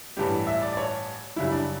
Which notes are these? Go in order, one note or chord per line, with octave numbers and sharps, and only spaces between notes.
A1 G2 E3 G3 G4
E5
D5
D5
C#5
F#2 C#3 G3 E4
D4